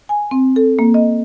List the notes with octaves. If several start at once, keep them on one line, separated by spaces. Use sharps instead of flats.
G#5
C4
A4
A#3
D#5